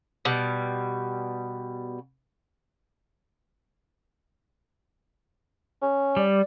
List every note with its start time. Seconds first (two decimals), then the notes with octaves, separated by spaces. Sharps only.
0.25 B2 G3
5.82 C#4
6.17 G3 D5